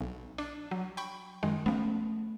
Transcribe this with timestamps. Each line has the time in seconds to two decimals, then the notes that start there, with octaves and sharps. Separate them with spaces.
0.01 B1
0.38 D4
0.71 F#3
0.97 G5 B5 C#6
1.43 F#2 D#3 G#3
1.66 F3 A3 B3 C#4